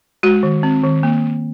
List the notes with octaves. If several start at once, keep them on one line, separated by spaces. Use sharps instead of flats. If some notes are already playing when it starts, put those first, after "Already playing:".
G#3 F#4
D#3
C4
D#3
A#3